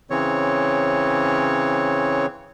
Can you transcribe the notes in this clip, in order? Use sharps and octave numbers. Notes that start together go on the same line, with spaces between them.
C#3 E3 C4 C#5